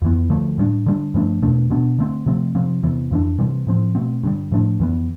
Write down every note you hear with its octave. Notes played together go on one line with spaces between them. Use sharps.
F2 E3 B3
D3 F3 A3
A2 G3 B3 D4
D3 G3 D4
G2 F3 A3 D4
E2 B2 A3 D4
B2 B3 D4
D3 A3 C4
C3 F3 A3 C4
C3 F3 C4
E2 C3 E3 B3
F2 E3 B3 D4
C3 E3 G3 C4
A2 F3 C4
B2 A3 C4
G2 D3 G3
A2 F3 A3 D4
F2 E3 B3